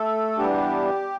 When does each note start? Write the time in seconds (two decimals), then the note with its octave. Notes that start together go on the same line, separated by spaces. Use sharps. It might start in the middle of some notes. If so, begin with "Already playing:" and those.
Already playing: A3 A4
0.38 E2 E3 G3 B3 D4 G4